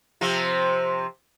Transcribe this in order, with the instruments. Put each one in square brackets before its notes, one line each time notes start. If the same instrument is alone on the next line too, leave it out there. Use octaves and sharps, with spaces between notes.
[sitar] C3 F3 C4